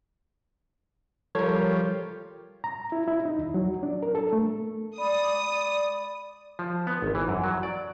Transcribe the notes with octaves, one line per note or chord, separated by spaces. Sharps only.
F3 G3 A4 A#4 C#5
A#5
E4
E4
D#4
D#2
F#3
D4
A#4
A4
A3
G#3 D5 B5 D#6
D5
F3
B3
G#1
E3
F#2
F#3
D5